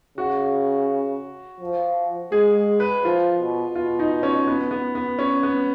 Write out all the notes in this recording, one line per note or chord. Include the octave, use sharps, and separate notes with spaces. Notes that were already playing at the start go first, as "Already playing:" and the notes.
C#3 F#4
F3
G#3 G#4
B4
F3 F4
B2
B2 F4
D#4
C#4
B3
B3
B3
C#4
B3